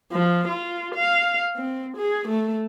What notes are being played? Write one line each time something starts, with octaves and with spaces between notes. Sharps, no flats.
F3
F4
F5
C4
G#4
A3